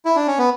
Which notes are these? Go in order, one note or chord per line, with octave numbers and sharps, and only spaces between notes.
E4
D4
C#4
B3